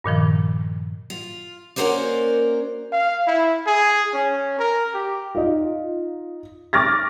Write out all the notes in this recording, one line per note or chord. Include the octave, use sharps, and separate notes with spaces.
G2 A#2 D#3 F3
F4
A#3 C#4 F#4 A#4 C5 D5
F5
E4
G#4
C#4
A#4
G4
D#4 F4
C#6 D6 F6 A6 A#6